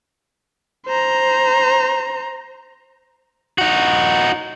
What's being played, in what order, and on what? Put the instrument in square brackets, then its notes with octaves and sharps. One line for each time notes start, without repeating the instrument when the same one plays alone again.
[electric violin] C5 A#5
[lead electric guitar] D#4 F#4